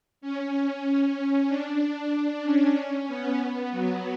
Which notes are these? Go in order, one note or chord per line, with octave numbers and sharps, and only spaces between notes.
C#4
D4
D4
C#4
B3
F#3